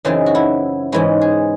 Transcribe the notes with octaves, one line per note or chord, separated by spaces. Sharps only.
F#2 C#3 E3 C4 D#4
F#4
E4
G#2 E3 G#3 C#4 E4
G#4